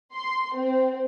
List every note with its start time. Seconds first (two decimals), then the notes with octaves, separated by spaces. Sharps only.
0.14 C6
0.55 C4